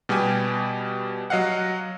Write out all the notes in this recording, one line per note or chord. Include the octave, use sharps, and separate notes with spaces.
B2 G3 B3 G4 G#5
F#3 D#5 F5 F#5